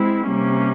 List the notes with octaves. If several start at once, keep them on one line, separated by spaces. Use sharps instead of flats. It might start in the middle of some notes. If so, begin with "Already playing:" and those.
Already playing: G#3 C4 E4
C3 G3 A#3 C#4